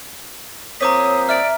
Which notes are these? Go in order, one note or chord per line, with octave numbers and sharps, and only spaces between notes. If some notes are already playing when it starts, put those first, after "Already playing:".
F3 A#3 C4 C#5 A#5 D6 D#6 B6
D5 E5 F6